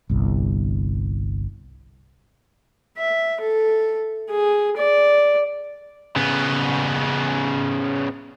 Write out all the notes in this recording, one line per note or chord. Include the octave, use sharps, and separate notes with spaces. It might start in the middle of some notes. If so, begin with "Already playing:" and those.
G1 C2
E5
A4
G#4
D5
C#3 B3